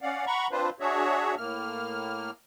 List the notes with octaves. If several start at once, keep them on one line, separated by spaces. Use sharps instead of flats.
C#4 D5 F5 F#5
F#5 A#5 B5 C#6
C4 D4 F4 B4 C5
D4 F#4 G#4 C#5 E5
A2 A#3 F6